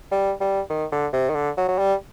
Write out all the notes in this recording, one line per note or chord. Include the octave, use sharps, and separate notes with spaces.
G3
G3
D#3
D3
C3
D#3
D3
F#3
F#3
G3